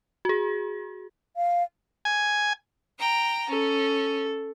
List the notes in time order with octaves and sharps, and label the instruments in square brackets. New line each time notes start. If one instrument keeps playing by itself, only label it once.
[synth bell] F#4 G#4
[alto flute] F5
[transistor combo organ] G#5
[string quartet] G5 A#5
[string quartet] C#4 [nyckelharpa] A4